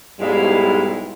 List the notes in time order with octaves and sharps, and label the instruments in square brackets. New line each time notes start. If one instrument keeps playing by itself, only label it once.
[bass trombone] B1 [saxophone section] G#2 G#3 [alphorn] G3 [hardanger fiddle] E4 F5